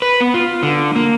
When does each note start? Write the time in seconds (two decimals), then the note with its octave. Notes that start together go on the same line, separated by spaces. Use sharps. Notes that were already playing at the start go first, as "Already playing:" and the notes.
0.02 B4
0.21 B3
0.34 F4
0.63 D3
0.96 A#3